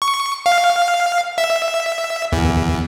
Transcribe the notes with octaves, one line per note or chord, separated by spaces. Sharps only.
C#6
F5
E5
E2